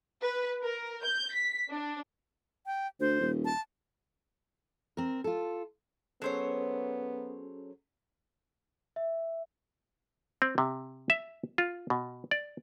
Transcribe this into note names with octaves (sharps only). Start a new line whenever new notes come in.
B4
A#4
G6
B6
D4
G5
D2 C5
D#1
A5
C4 A#4
F4 A4
F#3 B3 C#4 G#4 A4 C5 C#5
E5
C4
C3
E5
F4
B2
D5